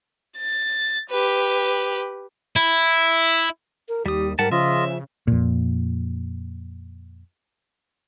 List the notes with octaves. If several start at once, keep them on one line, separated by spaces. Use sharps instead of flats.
A6
G4 B4
E4
A#4
D#2 G3 G4 D#6
G#2 G3 A#4 F#5 A5
C#3 F3 F4 D#5 E5
F2 A#2